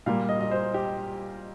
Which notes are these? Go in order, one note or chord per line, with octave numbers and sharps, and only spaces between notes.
A#2 G3 A#3 F5
D#5
D#5
C5
G4